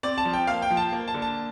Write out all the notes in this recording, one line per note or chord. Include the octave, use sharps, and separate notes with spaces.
C4 D5
A5
F3
G5
A#3 F5
G5
F3
A5
A#3
A5
D3
A5